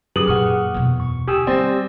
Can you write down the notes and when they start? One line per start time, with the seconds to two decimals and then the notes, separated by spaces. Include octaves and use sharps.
0.16 F#2 G4 G#4 B4 D#6 F#7
0.28 A#2 A#3 F#5 C#6 F6
0.74 E2 B2
1.00 C#6
1.28 D2 G4 G#5 D#6 E6
1.47 G3 C4 D5 A6 A#6